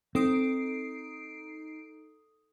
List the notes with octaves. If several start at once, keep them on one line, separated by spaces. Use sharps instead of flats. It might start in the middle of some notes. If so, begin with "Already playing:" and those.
C4 D#4 A4 D#6 C7 D7